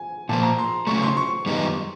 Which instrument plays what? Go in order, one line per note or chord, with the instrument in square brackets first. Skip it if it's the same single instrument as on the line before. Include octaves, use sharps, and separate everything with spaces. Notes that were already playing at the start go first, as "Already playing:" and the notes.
Already playing: [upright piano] G#5
[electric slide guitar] A#2 F3 A#3 [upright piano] A5
[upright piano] A#5
C6
[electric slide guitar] C#3 F#3 A3 [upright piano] C#6
[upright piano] C6
C#6
[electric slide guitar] F#2 D#3 G3 B3 D#4